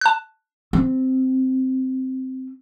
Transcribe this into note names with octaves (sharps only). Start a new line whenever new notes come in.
A5 F#6
C4